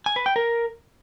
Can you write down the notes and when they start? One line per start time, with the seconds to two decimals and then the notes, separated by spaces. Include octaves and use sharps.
0.06 G#5
0.16 B4
0.26 G5
0.36 A#4